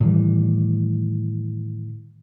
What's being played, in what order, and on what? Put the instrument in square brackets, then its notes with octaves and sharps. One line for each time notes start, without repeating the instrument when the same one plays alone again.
[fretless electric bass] A2 D#3 E3 G3